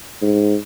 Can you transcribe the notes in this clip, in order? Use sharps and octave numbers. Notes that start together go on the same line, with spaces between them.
G#2